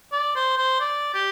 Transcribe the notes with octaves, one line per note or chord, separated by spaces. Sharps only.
D5
C5
C5
D5
G4